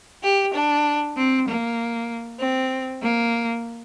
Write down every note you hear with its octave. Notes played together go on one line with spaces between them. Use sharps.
G4
D4
C4
A#3
C4
A#3